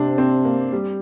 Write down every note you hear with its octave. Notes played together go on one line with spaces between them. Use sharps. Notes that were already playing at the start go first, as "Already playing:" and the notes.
Already playing: C3 C4 D4
C4
A#3
G3